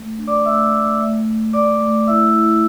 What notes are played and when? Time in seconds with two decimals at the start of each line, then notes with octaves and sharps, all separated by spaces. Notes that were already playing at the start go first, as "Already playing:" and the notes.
Already playing: A3
0.18 D4
0.27 D5 D6
0.45 A3 E5 E6
0.72 A3
1.00 A3
1.26 A3
1.53 A3 D5 D6
1.81 A3
2.07 E4 E5 E6
2.34 E4